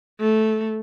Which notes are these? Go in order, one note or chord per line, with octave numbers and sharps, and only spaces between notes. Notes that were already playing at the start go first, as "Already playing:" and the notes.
A3